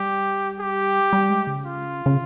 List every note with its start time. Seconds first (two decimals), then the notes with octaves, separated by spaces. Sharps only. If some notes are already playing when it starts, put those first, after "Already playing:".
Already playing: G3 G4
0.60 G4
1.13 G3
1.30 G#3
1.47 C#3
1.64 F4
2.06 C#3